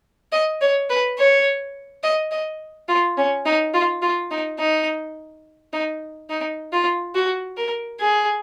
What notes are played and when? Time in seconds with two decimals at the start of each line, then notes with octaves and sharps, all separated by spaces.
0.32 D#5
0.61 C#5
0.90 B4
1.18 C#5
2.03 D#5
2.31 D#5
2.88 F4
3.17 C#4
3.45 D#4
3.74 F4
4.02 F4
4.31 D#4
4.59 D#4
5.73 D#4
6.30 D#4
6.72 F4
7.15 F#4
7.57 A#4
8.00 G#4